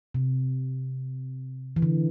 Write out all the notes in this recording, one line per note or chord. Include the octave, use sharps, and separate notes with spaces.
C3
E3
D3